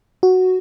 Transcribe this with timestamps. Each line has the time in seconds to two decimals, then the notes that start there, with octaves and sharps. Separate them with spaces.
0.23 F#4